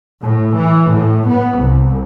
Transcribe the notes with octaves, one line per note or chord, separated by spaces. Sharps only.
A2
E3
A2
B3
C2